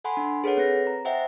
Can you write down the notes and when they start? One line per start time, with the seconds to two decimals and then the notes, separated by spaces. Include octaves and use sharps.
0.04 A4 F#5 G#5 B5 C6
0.17 D4
0.44 G#4 A4 B4 C#5 F#5
0.57 C4 B4 A#6
0.87 A#5
1.05 C5 D#5 E5 F#5 G5